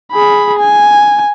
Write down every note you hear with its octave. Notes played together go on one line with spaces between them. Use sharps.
G#4 B5
G#5